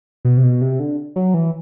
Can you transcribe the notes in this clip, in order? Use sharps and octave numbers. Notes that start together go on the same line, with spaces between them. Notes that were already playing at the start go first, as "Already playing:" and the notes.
B2
C3
B2
C3
D3
F#3
E3